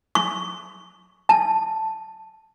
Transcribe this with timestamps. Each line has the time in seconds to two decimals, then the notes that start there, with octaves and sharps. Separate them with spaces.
0.15 C#6
1.29 A5